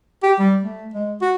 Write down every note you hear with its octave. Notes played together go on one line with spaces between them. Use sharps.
G4
G3
A3
G#3
F#4